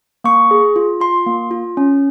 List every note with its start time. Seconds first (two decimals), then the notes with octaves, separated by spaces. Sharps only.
0.24 A#3 C#6
0.51 G#4
0.76 F4
1.00 F4 C6
1.26 A#3
1.51 F4
1.77 C#4